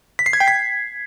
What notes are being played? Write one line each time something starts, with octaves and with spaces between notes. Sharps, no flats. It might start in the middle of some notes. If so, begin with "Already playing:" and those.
B6
C7
G#6
G5
B6